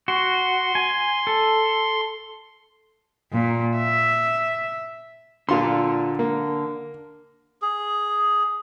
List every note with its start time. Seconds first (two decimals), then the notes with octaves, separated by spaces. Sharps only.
0.08 F#4 C6
0.75 G#5
1.27 A4
3.32 A#2
3.77 E5
5.49 A#2 D3 F4 C6
6.19 A#3
7.62 G#4